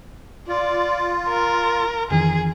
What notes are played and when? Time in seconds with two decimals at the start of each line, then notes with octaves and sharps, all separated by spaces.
0.48 F4 D5
1.28 A#4
2.10 F2 D#3 E3 G#4